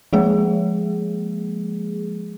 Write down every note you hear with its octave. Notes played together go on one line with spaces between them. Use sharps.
F3 G#3 A#3 G#4